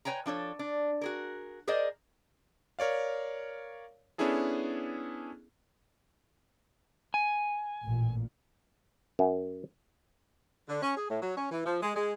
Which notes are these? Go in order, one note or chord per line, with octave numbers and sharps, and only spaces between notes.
B4 C#5 G5 G#5 A#5
F3 D4 A4 C#5
D4
F#4 G#4 A#4
G#4 A#4 C5 D5 D#5
A#4 C#5 D5 F5
B3 C#4 D4 E4 G#4 A4
G#5
A1 A#2
F#2
D3
C#4
G#4
A2
F#3
C#4
E3
F3
G#3
G#3